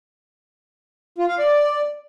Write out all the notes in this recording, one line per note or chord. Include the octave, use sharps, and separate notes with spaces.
F4
F5
D5